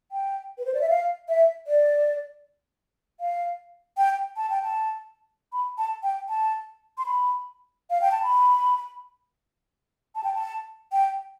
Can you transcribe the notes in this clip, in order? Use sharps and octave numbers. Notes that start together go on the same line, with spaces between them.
G5
B4
C5
D5
E5
F5
E5
D5
F5
G5
A5
G5
A5
B5
A5
G5
A5
C6
B5
F5
G5
A5
B5
A5
G5
A5
G5